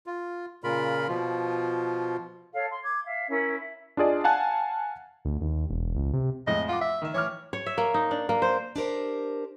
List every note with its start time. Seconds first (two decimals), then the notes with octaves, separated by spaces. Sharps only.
0.06 F4
0.64 A#2 C#3 F4 A#4 B5
1.08 B2 F3 F4
2.53 A4 C#5 F5
2.69 C6
2.82 D6 G#6
3.04 E5 F5
3.28 C#4 E4 A#4
3.57 E5
3.97 D4 F4 G#4 D5 D#5
4.24 F5 F#5 G#5 A5 F#6
5.25 D2
5.41 D#2
5.70 E1
5.96 C#2
6.13 C3
6.47 F2 A2 G#3 D#5
6.69 F4 F#5 D6
6.81 E5
7.02 D#3 E5
7.14 E3 C#5 D6 F6
7.53 C#5
7.66 E5
7.78 A#3
7.94 D#4
8.11 D4
8.29 A#3
8.42 C5
8.76 D4 G4 A#4 C5